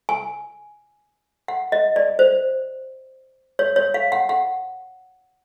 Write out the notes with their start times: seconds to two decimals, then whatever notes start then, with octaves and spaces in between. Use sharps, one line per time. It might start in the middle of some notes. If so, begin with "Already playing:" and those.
0.09 G#5
1.48 F#5
1.72 D#5
1.96 D5
2.19 C5
3.59 C#5
3.76 C#5
3.94 F5
4.12 F#5
4.29 F#5